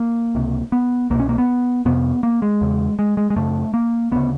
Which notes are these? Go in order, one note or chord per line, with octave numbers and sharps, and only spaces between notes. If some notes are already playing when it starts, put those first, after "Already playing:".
Already playing: A#3
C#2 C3
B3
C2 B2 A#3
C#4
A#3
B3
F2 C3 B3
A#3
G#3
E2 C#3
G#3
G#3
G#3
F#2 C#3 A3
A#3
D2 C#3 B3